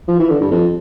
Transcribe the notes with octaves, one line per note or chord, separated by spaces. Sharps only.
F3
E3
D3
G2
F2